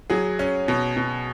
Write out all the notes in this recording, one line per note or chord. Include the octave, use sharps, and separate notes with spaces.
F#3 G#4
C#4
B2
B2